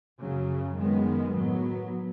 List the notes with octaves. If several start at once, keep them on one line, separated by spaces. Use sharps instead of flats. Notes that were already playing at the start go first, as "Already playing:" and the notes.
F#2 C#3 F#3
F#2 D#3 G#3 B3
A2 F#3 B3